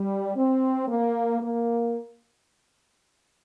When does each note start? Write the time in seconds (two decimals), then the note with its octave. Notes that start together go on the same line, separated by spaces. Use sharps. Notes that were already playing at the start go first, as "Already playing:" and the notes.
Already playing: G3
0.36 C4
0.88 A#3
1.41 A#3